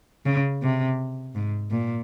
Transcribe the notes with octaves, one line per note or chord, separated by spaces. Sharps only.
C#3
C3
G#2
A#2